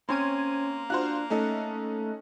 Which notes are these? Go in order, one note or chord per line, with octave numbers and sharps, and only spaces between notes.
A#3 C4 C#4 C6 G#6 D#7
D4 F4 F#4 C5 F#6
A3 C#4 D#4 A4